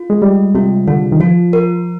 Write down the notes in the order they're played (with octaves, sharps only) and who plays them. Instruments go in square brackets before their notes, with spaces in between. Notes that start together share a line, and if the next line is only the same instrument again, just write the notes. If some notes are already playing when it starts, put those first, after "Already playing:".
Already playing: [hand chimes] F4
[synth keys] G#3
[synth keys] G3 [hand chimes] D#5
[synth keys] C3 [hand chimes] F4
[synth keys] D3 [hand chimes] F4
[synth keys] D#3
[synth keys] F3 [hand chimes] F4
[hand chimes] A#4